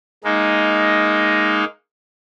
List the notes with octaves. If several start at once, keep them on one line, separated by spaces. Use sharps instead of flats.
G#3 A#3 D#4